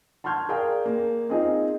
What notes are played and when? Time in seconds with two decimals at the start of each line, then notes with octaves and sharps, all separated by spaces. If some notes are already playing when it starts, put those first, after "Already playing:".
0.24 A5 C6 C#6 F6 G6 G#6
0.49 G#4 A#4 D5 F5 G5 G#5
0.85 A#3
1.29 C4 D#4 F4 G#4